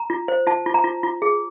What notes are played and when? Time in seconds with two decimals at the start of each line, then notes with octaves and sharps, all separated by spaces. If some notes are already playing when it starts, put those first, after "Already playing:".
Already playing: A#5
0.10 F4
0.28 C5
0.46 F4 A5
0.66 F4
0.74 A#5
0.84 F4
1.03 F4
1.22 G#4